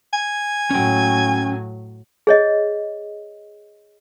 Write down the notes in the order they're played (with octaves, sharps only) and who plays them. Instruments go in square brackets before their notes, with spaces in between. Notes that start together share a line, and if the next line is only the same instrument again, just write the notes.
[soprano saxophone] G#5
[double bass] A2 F#3 [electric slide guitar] C#4 G5
[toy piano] G#4 C#5 D#5